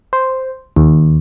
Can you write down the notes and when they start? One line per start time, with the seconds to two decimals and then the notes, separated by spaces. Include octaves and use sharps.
0.13 C5
0.76 D#2